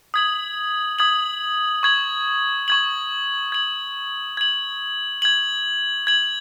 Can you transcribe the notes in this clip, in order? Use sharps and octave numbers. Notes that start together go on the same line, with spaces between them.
D#6 G#6 F#7
D#6 G#6 F#7
C#6 G#6 F#7
C#6 G#6 F#7
G#6 F#7
G#6 F#7
G#6 F#7
G#6 F#7